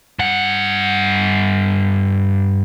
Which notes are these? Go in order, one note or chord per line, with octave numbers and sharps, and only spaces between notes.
G2 F#5